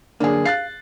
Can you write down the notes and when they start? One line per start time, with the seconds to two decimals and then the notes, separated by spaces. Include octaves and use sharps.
0.20 F#2 D3 A#3 D4 G#4
0.45 F5 F#6 A6 C7